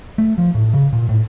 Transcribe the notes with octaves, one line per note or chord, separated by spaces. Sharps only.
A3
F3
A2
C#3
A#2
A2